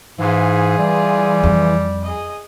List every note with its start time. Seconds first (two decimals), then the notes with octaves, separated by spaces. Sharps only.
0.19 G#2 E3 F4 G#4
0.78 G3
1.43 F2
2.03 G#4 D#5